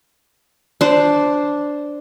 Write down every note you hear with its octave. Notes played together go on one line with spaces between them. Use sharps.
D4 C5